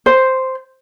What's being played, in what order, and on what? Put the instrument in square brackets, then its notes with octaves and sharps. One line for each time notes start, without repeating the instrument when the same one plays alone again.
[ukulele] C5